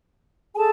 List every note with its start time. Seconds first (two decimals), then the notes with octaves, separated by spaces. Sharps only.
0.53 G#5
0.56 G#4 A4 A5